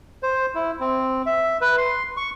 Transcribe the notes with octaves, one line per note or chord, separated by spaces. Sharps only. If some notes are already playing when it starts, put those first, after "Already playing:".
C5
E4
C4
E5
B4
C6
C#6